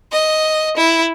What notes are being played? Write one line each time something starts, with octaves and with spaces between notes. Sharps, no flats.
D#5
E4